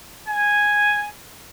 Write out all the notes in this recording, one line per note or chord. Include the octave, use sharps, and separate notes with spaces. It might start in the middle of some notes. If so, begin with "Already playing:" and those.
G#5